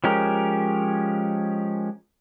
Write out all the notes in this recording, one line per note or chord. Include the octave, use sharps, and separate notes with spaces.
F3 G#3 C#4 G4 A#4